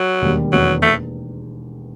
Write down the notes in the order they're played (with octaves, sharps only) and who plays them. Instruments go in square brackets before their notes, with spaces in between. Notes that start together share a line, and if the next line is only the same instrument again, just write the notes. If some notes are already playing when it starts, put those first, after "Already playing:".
Already playing: [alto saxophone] F#3
[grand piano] E1 D#2 D#3 G3
[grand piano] E1 E2 D#3 A3 [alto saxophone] F#3
[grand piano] E1 D#2 D#3 [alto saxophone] A3